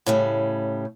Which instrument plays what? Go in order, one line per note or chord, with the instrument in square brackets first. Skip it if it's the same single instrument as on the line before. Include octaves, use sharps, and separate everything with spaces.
[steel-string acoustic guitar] A2 C#3 G3